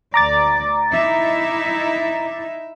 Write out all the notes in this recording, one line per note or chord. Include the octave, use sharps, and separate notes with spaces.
D2 D5 A#5 D6 A6
D#4 E4 E5